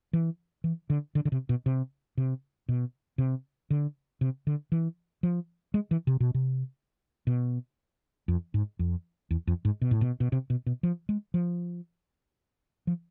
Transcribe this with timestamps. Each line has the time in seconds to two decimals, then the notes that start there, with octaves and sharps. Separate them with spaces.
0.13 E3
0.64 E3
0.90 D3
1.15 D3
1.25 D3
1.32 C3
1.49 B2
1.66 C3
2.17 C3
2.69 B2
3.18 C3
3.70 D3
4.21 C3
4.47 D3
4.72 E3
5.23 F3
5.74 G#3
5.91 E3
6.07 C3
6.20 B2
6.34 C3
7.27 B2
8.28 F2
8.54 G#2
8.79 F2
9.31 E2
9.47 F2
9.65 G#2
9.82 B2
9.91 A2
10.01 B2
10.20 B2
10.32 C3
10.50 B2
10.66 B2
10.83 F3
11.09 G#3
11.34 F3
12.87 F3